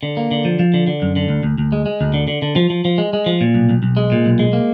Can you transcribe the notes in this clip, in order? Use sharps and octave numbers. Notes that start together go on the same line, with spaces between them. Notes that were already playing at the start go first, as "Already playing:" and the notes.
D3
A#3
D3
F3
F3
D3
D3
F#2
D3
D2
D2
D2
G#3
G#3
D2
D3
D3
D3
F3
F3
F3
G#3
G#3
F3
A#2
B1
B1
B1
G#3
A#2
B1
G#3
A#3